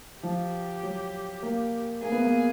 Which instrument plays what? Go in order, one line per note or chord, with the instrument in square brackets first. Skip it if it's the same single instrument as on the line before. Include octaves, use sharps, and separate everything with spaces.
[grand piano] F3 [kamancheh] G4
[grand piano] F#3
A#3
[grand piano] A#3 [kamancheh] G#4
[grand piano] B3
A#3